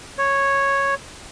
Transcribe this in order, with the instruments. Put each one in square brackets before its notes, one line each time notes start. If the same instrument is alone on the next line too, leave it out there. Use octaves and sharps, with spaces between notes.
[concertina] C#5